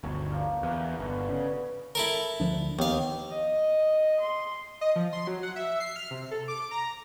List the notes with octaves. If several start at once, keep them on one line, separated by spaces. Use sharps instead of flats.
G1 D2 C#5 C#6
F3 D4 A#4
E2 A#3 F#4
G1 B2 D3 A4
C#3
E4 A4 A#4
D2 F3 D4
D#2 B3 F5
D#5
C6
D#5
F3
C6
F#3
F#5
E5
C7
F6
C3
A4
D6
A#5